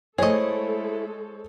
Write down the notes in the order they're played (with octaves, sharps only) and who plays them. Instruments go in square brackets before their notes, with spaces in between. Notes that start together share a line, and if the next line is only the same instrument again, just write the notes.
[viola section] G#3 A4 [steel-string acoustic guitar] A3 E4 [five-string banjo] G#4 D#5 [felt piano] C5 C#5